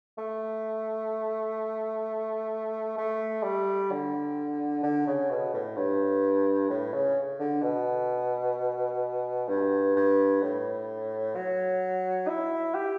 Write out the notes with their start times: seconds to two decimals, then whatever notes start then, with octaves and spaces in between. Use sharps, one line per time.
0.18 A3
2.98 A3
3.43 G3
3.91 D3
4.83 D3
5.07 C#3
5.30 B2
5.54 A2
5.76 G2
6.70 A2
6.94 C#3
7.39 D3
7.62 B2
9.49 G2
9.96 G2
10.42 A2
11.35 F#3
12.28 E4
12.75 G4